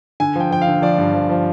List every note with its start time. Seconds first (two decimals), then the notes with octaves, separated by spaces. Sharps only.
0.20 D3 G#5
0.36 F3 G5
0.51 F3 G5
0.62 F5
0.67 D3
0.82 F3 D5
0.98 G2
1.13 F3
1.29 F3